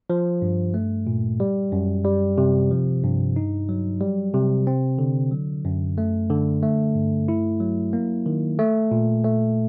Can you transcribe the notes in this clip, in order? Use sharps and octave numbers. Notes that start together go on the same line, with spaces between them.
F3
G2
A3
A#2
G3
F#2
G3
C3
F3
G2
D#4
F#3
G3
C3
C4
D3
F#3
F#2
A3
D3
A3
G2
E4
F#3
A#3
D#3
A3
A#2
A3